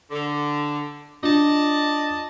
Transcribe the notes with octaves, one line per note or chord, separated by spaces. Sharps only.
D3
D4 F4 D5 D#5 A5